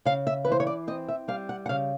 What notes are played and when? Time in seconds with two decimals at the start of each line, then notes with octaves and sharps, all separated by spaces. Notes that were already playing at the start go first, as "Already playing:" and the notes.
0.05 C#3 F5
0.27 E5
0.45 E3 B4
0.52 C5
0.60 C#5
0.67 D5
0.87 C4 D#5
1.08 E5
1.28 G3 F5
1.49 F#5
1.66 F#5
1.69 C#3 F5